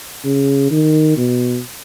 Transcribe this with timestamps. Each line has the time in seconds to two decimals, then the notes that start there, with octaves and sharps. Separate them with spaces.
0.24 C#3
0.71 D#3
1.17 B2